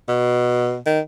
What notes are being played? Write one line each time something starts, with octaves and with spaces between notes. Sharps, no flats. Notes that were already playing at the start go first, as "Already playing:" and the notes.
B2
D#3